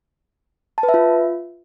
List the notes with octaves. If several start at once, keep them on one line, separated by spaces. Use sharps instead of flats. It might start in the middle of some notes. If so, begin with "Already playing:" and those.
A5
B4
E5
F4